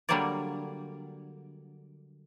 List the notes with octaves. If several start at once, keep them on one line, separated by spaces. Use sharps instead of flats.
D3 F#3 G3 A#3 C#5 D5